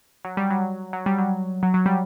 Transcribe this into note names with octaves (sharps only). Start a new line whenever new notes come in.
F#3
G3
F#3
F#3
G3
F#3
F#3
F#3
G3